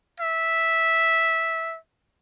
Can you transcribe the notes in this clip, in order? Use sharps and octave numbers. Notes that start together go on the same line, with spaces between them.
E5